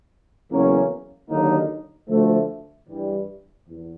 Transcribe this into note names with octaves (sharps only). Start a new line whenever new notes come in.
E2 C#3 F#3 A#3 C#4
D#2 D3 F#3 A#3 D#4
D2 D3 F3 A3
G2 E3 G3
E2